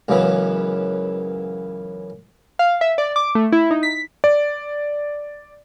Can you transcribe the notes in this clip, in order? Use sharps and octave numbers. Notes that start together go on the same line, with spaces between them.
C#2 F#2 C#3 E3 B3
F5
E5
D5
D6
A3
E4
D#4
B6
D5